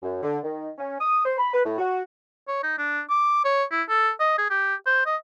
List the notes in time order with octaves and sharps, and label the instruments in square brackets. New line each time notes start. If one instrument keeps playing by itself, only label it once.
[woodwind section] F#2
D3
D#3
C#4
D#6
C5
B5
B4
A2
F#4
[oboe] C#5
D#4
D4
D6
C#5
E4
A4
D#5
G#4
G4
C5
D#5